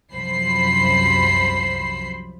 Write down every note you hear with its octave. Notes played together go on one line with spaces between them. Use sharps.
C2 F#2 F3 C5 B5 C7